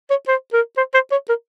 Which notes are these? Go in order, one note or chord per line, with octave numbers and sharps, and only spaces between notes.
C#5
C5
A#4
C5
C5
C#5
A#4